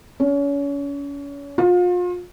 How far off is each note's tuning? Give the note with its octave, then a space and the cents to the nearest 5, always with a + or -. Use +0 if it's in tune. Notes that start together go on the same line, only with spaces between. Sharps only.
C#4 +35
F4 +35